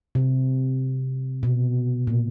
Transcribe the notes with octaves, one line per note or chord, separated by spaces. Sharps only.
C3
B2
A#2